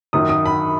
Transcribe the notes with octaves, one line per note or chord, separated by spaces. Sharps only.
F#2 D#3 F#3 D#6
D#6
B5